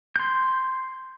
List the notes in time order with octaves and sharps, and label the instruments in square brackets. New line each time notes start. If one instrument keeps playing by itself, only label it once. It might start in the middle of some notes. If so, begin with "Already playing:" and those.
[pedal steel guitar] C6 G6